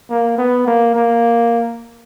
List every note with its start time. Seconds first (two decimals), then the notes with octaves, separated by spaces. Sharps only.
0.10 A#3
0.38 B3
0.66 A#3
0.95 A#3